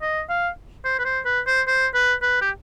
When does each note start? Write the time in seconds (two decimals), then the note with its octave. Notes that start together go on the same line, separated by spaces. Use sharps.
0.02 D#5
0.29 F5
0.85 C5
0.99 B4
1.05 C5
1.25 B4
1.46 C5
1.67 C5
1.94 B4
2.22 B4
2.41 G4